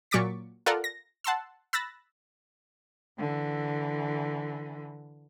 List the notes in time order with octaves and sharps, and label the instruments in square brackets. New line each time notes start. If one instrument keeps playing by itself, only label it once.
[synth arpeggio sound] A#2 F#3 C#6 D6 A6 B6
F4 A4 A#4 D5 F5 F#5
A#6
F#5 A5 C6 E6
B5 E6 F#6 A6 A#6
[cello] D3 E3